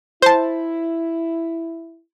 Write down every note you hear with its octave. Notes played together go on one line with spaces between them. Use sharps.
E4 C5 A5